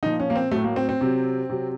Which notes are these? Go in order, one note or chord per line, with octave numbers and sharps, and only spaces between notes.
A#2 F3 D#4
C#4
A#3
C4
A2 F#3 A3
A#3
C4
C4
C3 F#3
C3 F#3